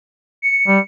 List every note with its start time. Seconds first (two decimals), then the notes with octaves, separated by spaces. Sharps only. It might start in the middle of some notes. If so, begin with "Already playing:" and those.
0.42 C#7
0.68 G3